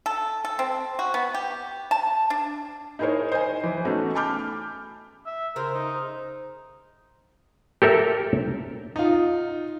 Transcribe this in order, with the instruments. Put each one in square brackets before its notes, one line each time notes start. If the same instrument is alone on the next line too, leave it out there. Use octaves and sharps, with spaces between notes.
[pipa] A4
A4
C4
F#4
B3
G4
A5
D4
[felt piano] D#4 E4 G#4 A#4 C5 C#5
C5 D#5 G#5
E3
A3 B3 C#4 D#4 F#4
G#5 A5 B5 D6 F6 G6
[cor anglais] E5
[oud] C#3 G#4 C5 [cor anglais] A#4
[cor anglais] D#4
[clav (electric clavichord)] G4 A4 A#4 E5
[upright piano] D#4 F4